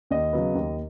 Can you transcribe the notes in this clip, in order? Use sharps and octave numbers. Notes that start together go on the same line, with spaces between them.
D#2 D#5
C#3 F#3 B3
D#2